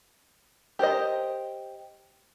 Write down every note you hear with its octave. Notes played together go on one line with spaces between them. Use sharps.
G4 A#4 C5 D#5